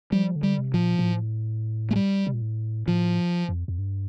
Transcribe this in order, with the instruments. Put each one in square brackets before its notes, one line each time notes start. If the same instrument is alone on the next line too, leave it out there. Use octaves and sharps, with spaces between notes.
[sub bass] F3 [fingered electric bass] G3
[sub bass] D3
[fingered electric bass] G3
[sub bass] C3
[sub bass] A2 [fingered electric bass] F3
[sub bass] A#2
A#2
A2
[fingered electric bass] A3
G3
[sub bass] C3
A#2
A2
[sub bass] A2 [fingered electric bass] F3
[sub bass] F2
F2
G2